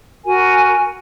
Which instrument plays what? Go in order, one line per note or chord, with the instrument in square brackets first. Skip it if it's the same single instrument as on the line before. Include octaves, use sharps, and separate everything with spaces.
[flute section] F#4 A#4 G#5